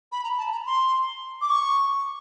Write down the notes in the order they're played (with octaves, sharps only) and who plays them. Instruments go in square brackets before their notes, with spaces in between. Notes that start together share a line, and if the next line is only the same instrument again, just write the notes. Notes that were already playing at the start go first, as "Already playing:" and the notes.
[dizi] B5
A#5
A5
A#5
C6
D6
C#6